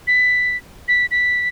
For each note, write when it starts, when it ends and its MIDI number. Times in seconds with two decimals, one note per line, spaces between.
0.07 0.57 95
0.88 1.06 95
1.11 1.48 95